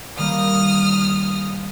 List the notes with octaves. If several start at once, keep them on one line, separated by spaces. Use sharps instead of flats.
D#3 G3 A#3 D#6 F6